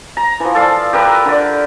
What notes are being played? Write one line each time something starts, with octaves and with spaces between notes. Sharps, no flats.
A#5
E3 F3
A4 D5 F5
G4 A#4 B4 E5
D3 D5